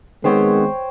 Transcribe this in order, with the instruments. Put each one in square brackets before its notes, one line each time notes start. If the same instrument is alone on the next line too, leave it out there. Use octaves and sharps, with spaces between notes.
[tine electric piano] D#3 B3 C4 [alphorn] G#3 [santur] C5 C#5 G5